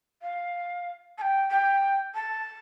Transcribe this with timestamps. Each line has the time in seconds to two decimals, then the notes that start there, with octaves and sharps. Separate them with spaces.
0.22 F5
1.18 A5
1.21 G5
1.50 G5
2.15 A5